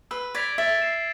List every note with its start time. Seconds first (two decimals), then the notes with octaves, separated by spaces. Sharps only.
0.11 B4 E6
0.35 D5 G#6 B6 D7 F7
0.58 E5 A6
0.82 C7 E7